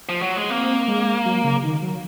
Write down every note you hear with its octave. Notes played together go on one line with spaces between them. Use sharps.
F3
F#3
G#3
A#3 C4
G#3
F#3
C#3
D#3
F#3